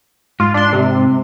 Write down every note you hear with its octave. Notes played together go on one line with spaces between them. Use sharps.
G#2 F4
D4 C6
C3